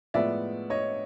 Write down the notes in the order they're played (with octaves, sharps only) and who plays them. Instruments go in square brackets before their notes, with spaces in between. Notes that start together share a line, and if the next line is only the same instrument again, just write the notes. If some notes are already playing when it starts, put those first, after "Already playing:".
[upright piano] A2 F3 G#3 B3 D5 E5
C#5 D#5